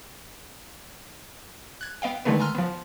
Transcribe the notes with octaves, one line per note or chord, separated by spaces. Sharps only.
F#6 G#6
B3 D#5 F5 G5
D3 D#3 G#3 A3 B3 B4
G#5 A#5 C6 E6 F6
F3 B3